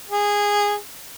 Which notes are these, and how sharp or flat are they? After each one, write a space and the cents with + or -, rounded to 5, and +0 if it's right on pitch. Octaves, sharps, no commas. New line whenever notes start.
G#4 -15